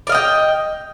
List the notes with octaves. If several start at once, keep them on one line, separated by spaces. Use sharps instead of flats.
D5 D#5 F5 G5